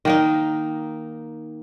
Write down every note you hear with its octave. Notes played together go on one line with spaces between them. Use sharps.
D#3 A#3 D#4